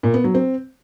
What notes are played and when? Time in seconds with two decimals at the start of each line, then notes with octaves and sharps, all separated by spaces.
0.03 A#2
0.14 B3
0.24 F#3
0.35 C4